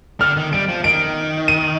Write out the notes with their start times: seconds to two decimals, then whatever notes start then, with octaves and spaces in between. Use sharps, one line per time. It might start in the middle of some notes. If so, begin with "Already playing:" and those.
0.20 D3 F6
0.37 D#3
0.53 G3 D7
0.69 F3
0.84 D#3 D7
1.48 D#7